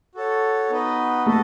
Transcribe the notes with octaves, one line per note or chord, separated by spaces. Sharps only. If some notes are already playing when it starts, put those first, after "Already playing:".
F#4 A4 C#5
B3 D#4 F#4 B4 D#5
A3 F#4 A4 D#5